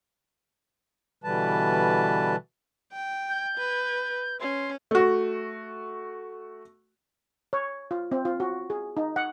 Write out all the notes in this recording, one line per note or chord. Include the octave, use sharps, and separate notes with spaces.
B2 D3 E3 G3 B4 A5
G5
G6
B4
C#4 C6
A3 F#4
C#5
F4
C4
F4
F#4
G#4
D#4
F#5